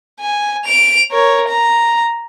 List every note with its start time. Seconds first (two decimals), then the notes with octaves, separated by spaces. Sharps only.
0.20 G#5
0.65 D7 F7
1.11 A#4 C#5
1.48 A#5